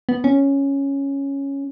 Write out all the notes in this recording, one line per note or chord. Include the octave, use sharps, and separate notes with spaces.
B3
C#4